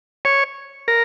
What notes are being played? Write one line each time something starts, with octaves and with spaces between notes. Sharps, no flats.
C#5
A#4